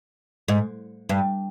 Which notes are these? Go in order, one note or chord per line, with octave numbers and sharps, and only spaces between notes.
G#2
G2